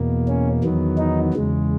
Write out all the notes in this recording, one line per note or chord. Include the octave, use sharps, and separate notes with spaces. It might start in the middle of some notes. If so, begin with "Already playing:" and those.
Already playing: E2 B2 A#3
C#4
E2 D#3 F#3 B3
D#4
E2 C#3 G#3